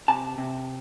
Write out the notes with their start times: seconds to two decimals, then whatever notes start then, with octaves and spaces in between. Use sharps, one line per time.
0.08 C3 A5
0.38 C3